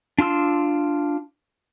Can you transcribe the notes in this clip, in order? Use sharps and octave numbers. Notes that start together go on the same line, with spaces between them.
D4 F4 C6 E6